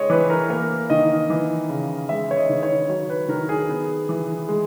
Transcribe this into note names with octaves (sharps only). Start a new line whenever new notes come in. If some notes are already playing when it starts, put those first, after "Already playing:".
Already playing: G#3 C#5 D#5
E3 B4
A#4
A#3 A#4
D#3 D#5
E3
C#3
G#3 E5
C#5
D#5
D#3
C#5
F#3 C#5
B4
D#3 A#4
G#4
B3
E3
G#3